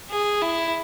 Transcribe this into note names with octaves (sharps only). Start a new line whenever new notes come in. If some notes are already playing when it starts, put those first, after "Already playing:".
G#4
E4